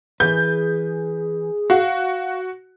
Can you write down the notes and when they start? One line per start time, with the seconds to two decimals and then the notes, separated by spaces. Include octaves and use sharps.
0.20 E3 G#4 B4 G6
1.70 F#4 F5